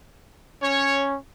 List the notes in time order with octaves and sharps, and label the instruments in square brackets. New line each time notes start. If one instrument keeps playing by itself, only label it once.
[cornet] C#4 [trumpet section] C#5